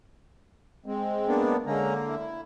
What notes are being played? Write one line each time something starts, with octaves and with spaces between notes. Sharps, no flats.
G#3 C4
A#3 B3 D4
D3 G#3 A#3 C#4 A#5
E4